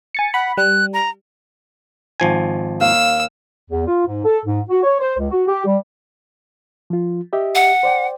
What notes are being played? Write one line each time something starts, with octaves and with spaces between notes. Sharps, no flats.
G#5 A6 C#7
F#5 B5
G3 F#6
A#5
G#1 F3 G#5
D#2 F5 E6
E2
F4
G#2
A4
G#2
F#4
C#5
C5
C#2
F#4
G4
G3
F3 F4
G4 D#5 E5
F#5
C5 D5 G5